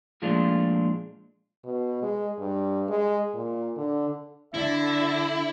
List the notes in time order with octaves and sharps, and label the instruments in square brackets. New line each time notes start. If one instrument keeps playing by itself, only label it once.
[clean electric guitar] A#2 F3 G#3 A3 D4 F4
[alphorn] B2
G#3
G2
G#3
A#2
D3
[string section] D3 [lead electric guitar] E4 [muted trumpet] E5